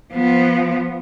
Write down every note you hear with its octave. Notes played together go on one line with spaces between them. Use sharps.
F3 B3